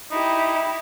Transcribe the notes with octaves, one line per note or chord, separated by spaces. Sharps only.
D#4 E4 G4